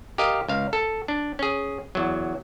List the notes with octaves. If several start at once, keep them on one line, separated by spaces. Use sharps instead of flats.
G4 A#4 D#5 F5
C#2 F5
A4
D4
C#4 G#4
E2 F#3